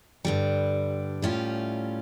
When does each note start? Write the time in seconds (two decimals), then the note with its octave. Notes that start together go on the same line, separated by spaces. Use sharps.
0.25 G2 D3 G3
1.22 A2 G3 C#4 F4